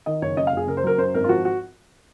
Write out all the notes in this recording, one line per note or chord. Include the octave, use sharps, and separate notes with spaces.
D#3 D#5
F#1 C#5
F#2 D#5
F5
F#1 G#4
C#3 A#4
C5
F#3 A#4
F#2 C5
G#1 A#4
F4
F3 F#4
F#4